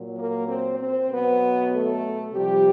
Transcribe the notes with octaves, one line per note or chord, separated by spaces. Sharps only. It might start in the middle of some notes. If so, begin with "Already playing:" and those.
Already playing: A#2 F#3
A#3 A#4
C4 C5
C4 C5
B2 F#3 B3 B4
A3 A4
C3 F3 G3 G4